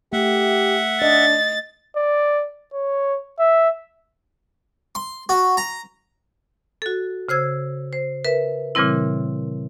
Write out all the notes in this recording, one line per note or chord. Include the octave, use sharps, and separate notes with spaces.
A3 G4 E5 F#5
D4 D#5 A6
D5
C#5
E5
C6
F#4
A#5
F#4 A4
C#3 C5 E6 G#6
C5
A#4 B4 E5
A#2 C#3 E3 G3 C4 E4